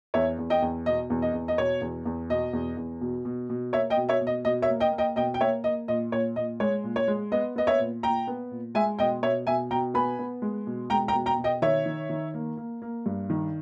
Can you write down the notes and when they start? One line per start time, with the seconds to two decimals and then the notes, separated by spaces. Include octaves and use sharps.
0.14 E2 C#5 E5
0.38 E2
0.50 D#5 G5
0.62 E2
0.86 B2 D#5
1.10 E2
1.22 D#5
1.34 E2
1.48 D#5
1.58 B2 C#5
1.81 E2
2.05 E2
2.30 B2 D#5
2.53 E2
2.77 E2
3.01 B2
3.25 B2
3.50 B2
3.73 A#3 C#5 E5
3.90 D#5 G5
3.97 B2
4.09 C#5 E5
4.21 B2
4.27 D#5
4.45 B2 D#5
4.62 C#5 E5
4.69 A#3
4.80 D#5 G5
4.92 A#3
4.98 D#5 G5
5.16 B2 D#5 G5
5.34 G5
5.40 A#3 C#5 E5
5.64 A#3 D#5
5.88 A#2 D#5
6.12 A#2 C#5
6.36 A#2 D#5
6.60 G#3 C#5
6.84 A#2
6.96 C#5
7.08 G#3
7.32 B3 D#5
7.56 B3 D#5
7.67 C#5 E5
7.80 A#2
8.03 A#2 G5 A#5
8.27 B3
8.51 A#2
8.75 G#3 E5 G#5
8.99 B2 D#5 G5
9.22 B2 C#5 E5
9.47 B2 E5 G#5
9.71 B2 G5 A#5
9.94 B3 G#5 B5
10.19 B3
10.42 G#3
10.67 B2
10.90 G#3 G5 A#5
11.08 G5 A#5
11.14 B2
11.26 G5 A#5
11.38 B2
11.44 D#5 G5
11.62 D#3 C#5 E5
11.86 D#3
12.10 D#3
12.34 A#3
12.57 A#3
12.82 A#3
13.06 G2
13.30 D#3